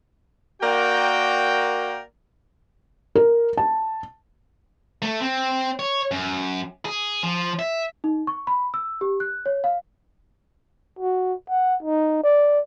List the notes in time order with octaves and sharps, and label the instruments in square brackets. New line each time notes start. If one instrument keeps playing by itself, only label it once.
[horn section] A#3 F#4 A#4 D5 G5
[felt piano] A#4
A5
[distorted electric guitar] A3
C4
C#5
F#2
G#4
F3
E5
[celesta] D#4
C#6
B5
E6
G4
F#6
C#5
F5
[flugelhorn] F#4
F#5
D#4
D5